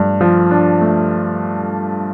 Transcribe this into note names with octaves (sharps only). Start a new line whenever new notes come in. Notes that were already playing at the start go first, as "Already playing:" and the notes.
Already playing: G2 F3 A3
F3
D4
A3